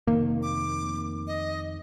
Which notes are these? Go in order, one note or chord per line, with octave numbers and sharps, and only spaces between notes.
F1 C3 D#3 A#3
D6
D#5